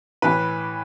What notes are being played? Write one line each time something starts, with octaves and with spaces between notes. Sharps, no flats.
A2 E3 B4